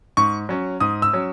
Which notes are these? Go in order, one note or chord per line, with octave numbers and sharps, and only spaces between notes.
G#2 C#6
F#3 C#4
G#2 D#6
E6
F#3 C#4